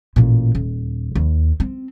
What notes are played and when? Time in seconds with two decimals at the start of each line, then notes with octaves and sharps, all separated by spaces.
0.16 A1 A#2
0.55 D#1
1.15 D#2
1.60 C4